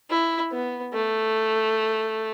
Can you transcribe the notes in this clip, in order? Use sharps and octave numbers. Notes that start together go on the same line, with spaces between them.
E4
B3
A3